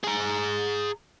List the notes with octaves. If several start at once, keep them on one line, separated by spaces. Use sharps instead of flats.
G#4 A#5